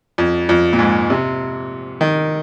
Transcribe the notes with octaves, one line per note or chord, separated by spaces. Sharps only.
F2
F2
A#2
G#2
C3
D#3